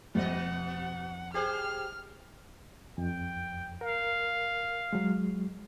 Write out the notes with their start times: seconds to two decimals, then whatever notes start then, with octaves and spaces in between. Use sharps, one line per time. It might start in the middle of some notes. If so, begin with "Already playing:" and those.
0.15 F2 B2 D#5 F#5
1.34 G4 G#4 C5 F6
2.98 F2 G5
3.81 A#4 F5
4.93 F#3 G#3